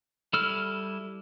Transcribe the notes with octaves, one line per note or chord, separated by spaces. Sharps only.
G3 E4 A4 F6